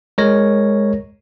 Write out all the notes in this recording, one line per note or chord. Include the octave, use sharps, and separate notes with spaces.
G#3 A#4 C#5 A#6